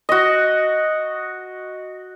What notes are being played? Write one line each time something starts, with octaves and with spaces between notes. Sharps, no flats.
F#4 D#5